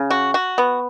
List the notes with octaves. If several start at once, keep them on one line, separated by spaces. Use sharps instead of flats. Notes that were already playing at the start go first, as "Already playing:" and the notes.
Already playing: C#3
F#4
F#4
B3